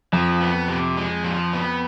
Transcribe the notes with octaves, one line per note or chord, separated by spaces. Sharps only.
F2 F3
B3
C3
G#3
F3
B3